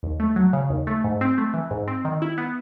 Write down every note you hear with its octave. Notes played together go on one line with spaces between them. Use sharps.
D#2
A3
F#3
C#3
D#2
A3
G#2
C4
A3
E3
G#2
C4
D#3
E4
B3